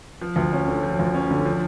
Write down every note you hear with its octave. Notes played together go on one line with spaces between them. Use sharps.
F3
D2
C#4
D3
F3
D2
C#4
D3
F3